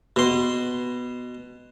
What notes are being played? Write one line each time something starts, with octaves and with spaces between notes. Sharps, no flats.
B2 C6